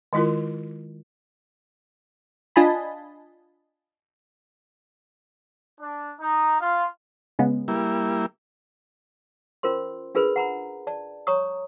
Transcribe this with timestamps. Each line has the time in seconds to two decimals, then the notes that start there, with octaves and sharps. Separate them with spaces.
0.13 D#3 G#3 E4 F4 A#4
2.56 D4 F4 D#5 G#5 A5 B5
5.79 D4
6.19 D#4
6.59 F4
7.39 C#3 G#3 B3
7.68 G3 A#3 E4
9.63 C#4 F4 A#4 C5 C6
10.15 D4 F4 G#4 A#4 B4 B5
10.36 F#5 A#5 B5
10.87 D5 A5
11.27 C#5 A#5 C#6 D#6